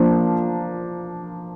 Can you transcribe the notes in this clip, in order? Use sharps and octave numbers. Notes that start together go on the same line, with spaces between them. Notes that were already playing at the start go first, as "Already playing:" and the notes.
Already playing: F3 A#3 D4